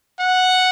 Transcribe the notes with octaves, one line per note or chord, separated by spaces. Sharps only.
F#5